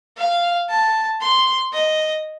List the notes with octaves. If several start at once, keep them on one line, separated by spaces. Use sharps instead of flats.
F5
A5
C6
D#5